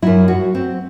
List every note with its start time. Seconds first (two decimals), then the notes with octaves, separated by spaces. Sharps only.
0.02 F#2 F#3 E4
0.28 F#4
0.55 C4